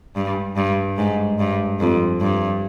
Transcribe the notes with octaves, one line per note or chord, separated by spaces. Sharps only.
G2
G2
G#2
G2
F2
G2